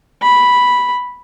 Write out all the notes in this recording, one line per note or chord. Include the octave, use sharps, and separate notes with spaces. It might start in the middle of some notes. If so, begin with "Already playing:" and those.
B5